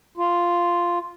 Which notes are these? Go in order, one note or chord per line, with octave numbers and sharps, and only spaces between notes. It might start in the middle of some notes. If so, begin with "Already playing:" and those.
F4